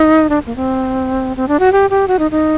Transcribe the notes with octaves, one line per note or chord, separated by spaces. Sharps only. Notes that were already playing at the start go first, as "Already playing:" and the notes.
Already playing: D#4
D4
A#3
C4
C4
D4
F#4
G4
G4
F#4
D#4
D#4